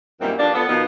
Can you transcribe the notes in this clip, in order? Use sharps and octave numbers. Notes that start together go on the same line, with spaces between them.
F#2 A#2 D#3 E3 G3 C4
G2 F3 A#3 D4
F3 B3 A4
B2 D#3 F3 B3 D#4 F4